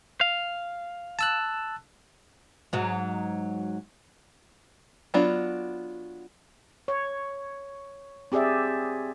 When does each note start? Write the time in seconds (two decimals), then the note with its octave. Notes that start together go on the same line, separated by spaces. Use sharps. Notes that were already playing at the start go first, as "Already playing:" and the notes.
0.21 F5
1.19 A5 E6 F#6
2.73 G#2 F#3
5.14 F#3 B3 D4 F4
6.88 C#5
8.32 C4 G4 G#4 D5 E5